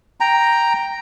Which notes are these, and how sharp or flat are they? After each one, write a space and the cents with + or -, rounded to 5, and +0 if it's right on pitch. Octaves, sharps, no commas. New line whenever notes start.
G5 +0 A#5 +0